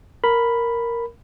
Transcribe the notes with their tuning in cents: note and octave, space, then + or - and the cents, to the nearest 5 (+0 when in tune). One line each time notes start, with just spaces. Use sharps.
A#4 +0 B5 +0